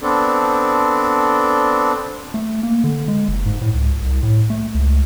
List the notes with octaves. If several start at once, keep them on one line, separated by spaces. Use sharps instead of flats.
B3 C4 D4 A4
A3
A#3
D3
G#3
F#1
G#2
A2
C#2
C2
A2
A3
C#2